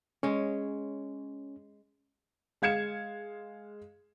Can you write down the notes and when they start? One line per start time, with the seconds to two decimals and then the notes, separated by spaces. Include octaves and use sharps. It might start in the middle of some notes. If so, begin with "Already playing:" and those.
0.23 G#3 C#4 C#5
2.62 G#3 F5 G#6 C#7 E7